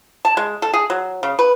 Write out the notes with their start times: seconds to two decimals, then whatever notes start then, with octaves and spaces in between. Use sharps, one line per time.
0.25 A5
0.37 G#3
0.62 A4
0.73 G#4
0.90 F#3
1.23 C#3
1.39 B4